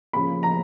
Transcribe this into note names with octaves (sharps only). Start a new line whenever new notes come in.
C#3 F3 A#3 B5
A#5